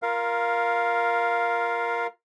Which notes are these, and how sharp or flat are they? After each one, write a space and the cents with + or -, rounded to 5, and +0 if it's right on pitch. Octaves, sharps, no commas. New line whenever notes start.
F4 +0 A#4 +10 F5 +0